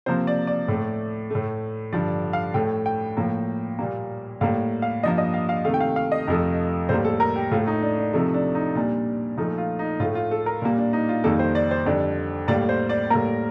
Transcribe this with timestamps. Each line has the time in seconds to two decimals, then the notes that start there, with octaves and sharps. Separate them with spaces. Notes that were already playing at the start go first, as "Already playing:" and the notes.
0.06 C3 F3 A#3 C5
0.27 D5
0.47 D5
0.68 A2 A3
1.30 A2 A3
1.93 G2 D3 F3 D5
2.33 F5
2.54 A2 A3 G5
2.86 G5
3.17 A2 F3 A#3
3.79 A#2 G3 A#3
4.41 A2 G3 A#3 F5
4.82 F5
5.03 G2 F3 A#3 D#5
5.18 D#5
5.34 F5
5.49 F5
5.65 C3 D#3 A3 F5
5.74 G5
5.80 F5
5.96 F5
6.12 D#5
6.28 F2 C3 F3 A3
6.89 A2 G3 A#3 C5
7.05 A4
7.20 A#4
7.36 G4
7.51 A2 A3 F4
7.67 D#4
7.82 D4
7.98 D4
8.13 C3 F3 A3 D#4
8.34 D4
8.55 D#4
8.75 A#2 G3 A#3 D4
9.37 A#2 F3 A3 D#4
9.58 F4
9.79 D#4
10.00 A2 F4
10.04 A3
10.15 F4
10.31 A4
10.46 A#4
10.62 A#2 G3 A#3
10.78 D4
10.93 D#4
11.09 F4
11.24 F2 D#3 G3 A#3 A4
11.39 C5
11.55 D5
11.71 C5
11.86 F2 D3 G3 D5
12.48 A2 G3 A#3 D5
12.69 C5
12.89 D5
13.10 A2 G3 A#3 A#4